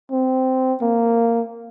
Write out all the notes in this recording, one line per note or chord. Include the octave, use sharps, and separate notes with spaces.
C4
A#3